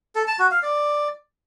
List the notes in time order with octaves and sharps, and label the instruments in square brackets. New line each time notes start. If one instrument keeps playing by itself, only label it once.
[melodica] A4
A5
F#4
F5
D5